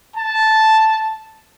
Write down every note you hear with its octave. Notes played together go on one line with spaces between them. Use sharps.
A5